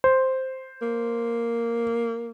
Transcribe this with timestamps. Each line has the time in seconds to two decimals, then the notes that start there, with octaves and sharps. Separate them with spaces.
0.04 C5
0.82 A#3